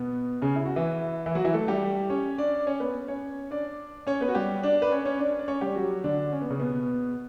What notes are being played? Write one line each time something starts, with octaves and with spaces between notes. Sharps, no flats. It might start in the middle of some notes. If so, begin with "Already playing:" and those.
Already playing: B2 B3
C#3 C#4
E4
F#4
E3 E4
E3 E4
F#3 F#4
E3 E4
A3 A4
G3 G4
C#4 C#5
D4 D5
C#4 C#5
B3 B4
C#4 C#5
D4 D5
C#4 C#5
B3 B4
F#4
G3 G4
D4 D5
B4
C#4 C#5
C#4 C#5
D4 D5
D5
C#4 C#5
G3 G4
F#3 F#4
D3 D4
C#4
B3
C#3 C#4
B2 B3